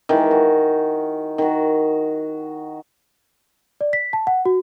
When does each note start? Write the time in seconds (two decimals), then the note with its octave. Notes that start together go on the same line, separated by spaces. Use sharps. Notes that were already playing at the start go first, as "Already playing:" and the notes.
0.09 D#3 E3 G#3
0.31 F#4
1.38 D#3 F#4
3.81 D5
3.93 B6
4.13 A5
4.27 F#5
4.45 F#4